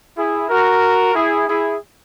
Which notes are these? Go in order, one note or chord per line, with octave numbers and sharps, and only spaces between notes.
E4 G#4
F#4 A#4
E4 G#4
E4 G#4